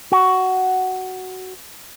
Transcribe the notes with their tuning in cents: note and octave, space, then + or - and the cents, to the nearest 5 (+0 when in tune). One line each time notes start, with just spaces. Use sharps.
F#4 +10